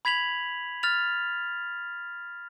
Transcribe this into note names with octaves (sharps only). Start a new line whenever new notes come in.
B5 G#6 B6 F7 F#7
F6 A6 F7